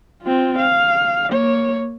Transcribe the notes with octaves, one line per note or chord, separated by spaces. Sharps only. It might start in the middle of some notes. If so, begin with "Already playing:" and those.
C4 F4
F5
A#3 C#5